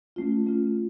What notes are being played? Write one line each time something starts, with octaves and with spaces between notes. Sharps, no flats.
A3 C#4 F4
A3 C#4 F4